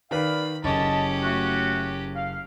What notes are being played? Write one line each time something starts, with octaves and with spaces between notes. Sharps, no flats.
D#3 B4 D5 F5 B5
F#1 C#4 G4 D#5 A5
A3 F#4
F5